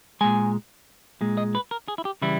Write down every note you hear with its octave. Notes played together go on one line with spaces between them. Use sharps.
A#2 G#3 G#5
A#2 G#3
D#5
B4
A#4
G#4
E4
G4
C#3 E3 G3 E4